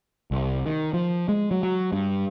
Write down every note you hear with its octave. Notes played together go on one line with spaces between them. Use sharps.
C2
D#3
F3
G#3
F#3
F#3
G2